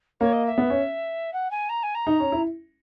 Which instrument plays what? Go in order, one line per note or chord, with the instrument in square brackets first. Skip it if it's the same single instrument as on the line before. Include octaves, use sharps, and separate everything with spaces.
[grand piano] A#3 [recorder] C#5
[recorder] D#5
E5
[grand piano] B3
C#4
[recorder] F#5
G#5
A#5
G#5
A#5
[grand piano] D#4
C#4
E4